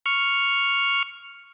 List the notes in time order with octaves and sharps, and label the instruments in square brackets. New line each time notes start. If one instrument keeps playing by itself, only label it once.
[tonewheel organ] C#6 F6